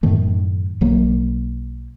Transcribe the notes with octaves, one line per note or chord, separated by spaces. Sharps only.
F#2 A2 D#3 A3
B1 F#3 A#3